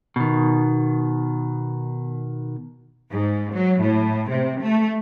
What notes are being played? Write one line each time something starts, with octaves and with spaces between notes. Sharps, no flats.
B2 D#3
G#2
F#3
A2
C3
A3